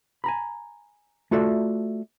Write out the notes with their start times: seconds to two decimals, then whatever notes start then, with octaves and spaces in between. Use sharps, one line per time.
0.24 G#5 A#5 B5
1.31 A3 F4 F#4 A4 D5 E5